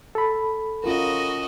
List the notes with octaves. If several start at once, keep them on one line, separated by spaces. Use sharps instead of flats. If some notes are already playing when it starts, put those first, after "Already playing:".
A4 B5
C#4 F4 F#4 A#4 D#5